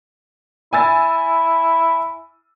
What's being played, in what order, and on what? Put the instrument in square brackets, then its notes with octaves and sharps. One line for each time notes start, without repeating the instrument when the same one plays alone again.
[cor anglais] E4 [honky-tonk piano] G#5 E6 A6